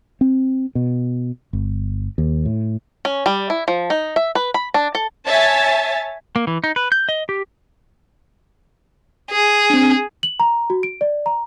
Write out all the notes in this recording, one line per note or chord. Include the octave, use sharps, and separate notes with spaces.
C4
B2
G1
D#2
A2
C#4
G3
E4
F3
D#4
E5
B4
B5
D4
A4
C#5 E5 G#5 A5 A6
A#3
E3
D#4
B4
G6
D#5
G4
G#4
C4 D4
F#7
A#5
F#4
D7
D5
A#5